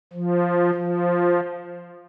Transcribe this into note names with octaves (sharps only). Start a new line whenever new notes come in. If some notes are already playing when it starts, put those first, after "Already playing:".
F3
F3